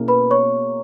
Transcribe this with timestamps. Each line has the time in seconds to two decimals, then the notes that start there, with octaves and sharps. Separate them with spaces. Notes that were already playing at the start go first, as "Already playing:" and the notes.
Already playing: B2 A#3 C#4 E4 G#4
0.08 B4 B5
0.31 C#5 C#6